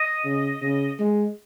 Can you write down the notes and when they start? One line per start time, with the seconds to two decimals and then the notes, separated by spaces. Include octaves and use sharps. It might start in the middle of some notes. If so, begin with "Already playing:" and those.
Already playing: D#5
0.25 C#3
0.62 C#3
1.00 G#3